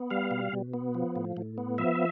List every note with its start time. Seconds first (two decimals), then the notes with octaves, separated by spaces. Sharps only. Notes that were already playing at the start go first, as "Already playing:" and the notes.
Already playing: B3
0.10 G3 F5
0.31 B2
0.53 B2
0.74 B3
0.95 F3
1.16 A2
1.37 A2
1.58 B3
1.78 F3 E5